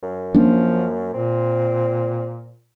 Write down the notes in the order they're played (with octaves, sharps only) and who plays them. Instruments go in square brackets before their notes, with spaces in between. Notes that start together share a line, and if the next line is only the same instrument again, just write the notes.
[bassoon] F#2
[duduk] F3 [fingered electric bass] A#3 C#4 D4
[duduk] A#2 [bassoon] C4